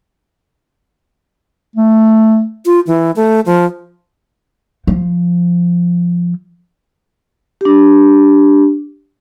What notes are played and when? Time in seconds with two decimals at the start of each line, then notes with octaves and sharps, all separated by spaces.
1.76 A3
2.65 F4
2.87 E3
3.16 A3
3.46 F3
4.87 F3
7.61 D4 G4